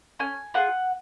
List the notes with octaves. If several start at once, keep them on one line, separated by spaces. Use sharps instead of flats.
C#4 G#5
F4 G#4 F#5